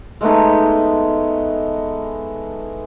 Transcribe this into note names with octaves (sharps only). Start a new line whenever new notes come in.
G#3 A3 B3 D#4